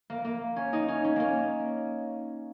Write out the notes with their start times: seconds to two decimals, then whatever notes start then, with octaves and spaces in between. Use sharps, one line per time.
0.10 A#3
0.25 A#3
0.56 C#4
0.73 D#4
0.88 C#4
1.04 C#4
1.16 A#3 C#4